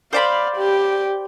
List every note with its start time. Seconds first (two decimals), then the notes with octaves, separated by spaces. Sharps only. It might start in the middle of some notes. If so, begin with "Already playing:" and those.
0.13 C5 D5 F5 B5
0.56 G4